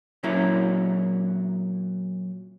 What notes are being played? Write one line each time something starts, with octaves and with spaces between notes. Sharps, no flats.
A#2 F#3 C#4 E4 A#4